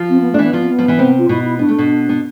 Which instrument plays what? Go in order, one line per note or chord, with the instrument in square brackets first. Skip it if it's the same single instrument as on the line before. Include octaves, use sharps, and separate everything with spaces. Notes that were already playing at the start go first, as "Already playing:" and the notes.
Already playing: [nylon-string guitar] F3 F4
[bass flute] C4
B3
[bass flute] A3 [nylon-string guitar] D4
[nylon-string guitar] E3 E4 [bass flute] B3
[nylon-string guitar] F3 F4
[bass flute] C4
B3
[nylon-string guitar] F3 F4
E3 E4
C3 C4
[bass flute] F4
[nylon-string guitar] B2 B3 [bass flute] E4
[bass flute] E4
[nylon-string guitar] B3 [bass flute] D4
[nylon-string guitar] A3
B2 B3
B3